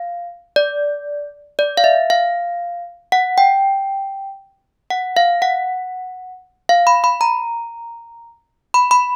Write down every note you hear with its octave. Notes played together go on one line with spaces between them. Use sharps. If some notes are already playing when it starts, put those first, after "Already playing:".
Already playing: F5
D5
D5
F5
E5
F5
F#5
G5
F#5
F5
F#5
F5
B5
B5
A#5
B5
B5